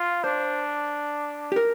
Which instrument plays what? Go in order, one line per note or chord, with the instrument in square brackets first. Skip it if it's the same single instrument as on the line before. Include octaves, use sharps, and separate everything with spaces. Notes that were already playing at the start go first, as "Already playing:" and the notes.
Already playing: [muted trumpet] F4
[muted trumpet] D4 [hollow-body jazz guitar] C5
[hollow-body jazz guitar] G4
A#4